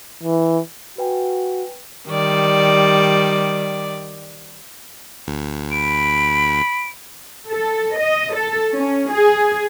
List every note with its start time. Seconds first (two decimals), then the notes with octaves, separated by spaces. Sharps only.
0.23 E3
0.98 F#4 B4 G5 G#5
2.07 D#3 G3 D5
5.28 D2
5.71 B5 D7
7.49 A4
7.98 D#5
8.35 A4
8.73 C#4
9.12 G#4